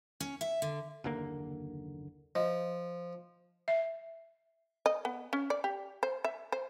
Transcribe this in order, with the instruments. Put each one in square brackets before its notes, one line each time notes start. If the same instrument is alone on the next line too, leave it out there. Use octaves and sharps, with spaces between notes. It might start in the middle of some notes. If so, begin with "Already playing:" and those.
[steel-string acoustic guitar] C#4
E5
D3
[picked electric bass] F#1 D#2 D3 A#3
[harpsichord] F3 [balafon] D#5
[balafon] E5
[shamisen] D#5
B3
C#4
D5
G4
C5
E5
C5